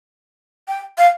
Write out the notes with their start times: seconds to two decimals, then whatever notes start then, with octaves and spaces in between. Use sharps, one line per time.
0.68 G5
0.98 F5